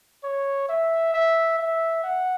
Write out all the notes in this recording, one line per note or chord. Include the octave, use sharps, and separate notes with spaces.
C#5
E5
E5
E5
F#5